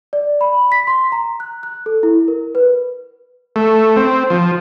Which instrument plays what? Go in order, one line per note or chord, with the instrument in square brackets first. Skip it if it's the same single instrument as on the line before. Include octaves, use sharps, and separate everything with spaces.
[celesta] D5
B5
B6
C6
A#5
F#6
F#6
A4
E4
A#4
B4
[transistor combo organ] A3
C4
F3